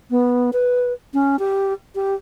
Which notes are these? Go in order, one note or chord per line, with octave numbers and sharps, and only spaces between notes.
B3
B4
C#4
G4
G4